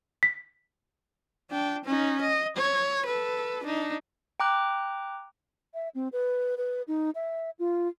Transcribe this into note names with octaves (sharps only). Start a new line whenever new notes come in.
B6
D4 G5
C#4 D#4
D#5
C#5
A4 B4
D4 D#4
G5 A#5 D6 F#6
E5
C4
B4
B4
D#4
E5
F4